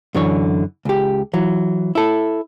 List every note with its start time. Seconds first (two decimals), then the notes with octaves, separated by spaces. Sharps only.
0.14 F#2 D3 E3 C#5
0.85 C#2 G4
1.33 E3 F#3
1.95 E4 A4